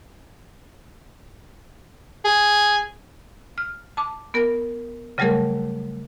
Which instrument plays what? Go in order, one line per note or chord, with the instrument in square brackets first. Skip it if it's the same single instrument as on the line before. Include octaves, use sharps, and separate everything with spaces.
[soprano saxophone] G#4
[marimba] F6
A5 D6
B3 A#4
C#3 F#3 G3 A3 G#4 A#4